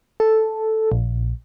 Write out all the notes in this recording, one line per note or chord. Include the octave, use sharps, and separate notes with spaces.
A4
A#1